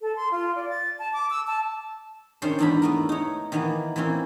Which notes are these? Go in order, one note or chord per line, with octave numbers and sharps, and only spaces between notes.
A4
C6
F4
D5
A6
A5
D6
E6
A5
D#3 C#4 D4 C5 C#5 C6
E2 G#2 D4 A#5 B5
A3 B3 A#4
D#4 C#5
D#3 E3 A#3 B3
E3 A#3 C4 C#4